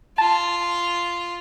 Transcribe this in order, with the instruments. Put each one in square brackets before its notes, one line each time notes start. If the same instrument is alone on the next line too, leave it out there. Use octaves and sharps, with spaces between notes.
[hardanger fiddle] F4 [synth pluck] A5